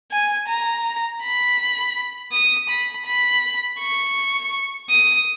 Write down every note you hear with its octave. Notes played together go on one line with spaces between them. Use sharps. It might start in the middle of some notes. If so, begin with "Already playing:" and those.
G#5
A#5
B5
D#6
B5
B5
C#6
D#6